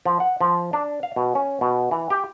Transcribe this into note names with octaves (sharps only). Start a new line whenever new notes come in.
F3
F#5
F3
D4
F5
B2
C#4
B2
E3
G4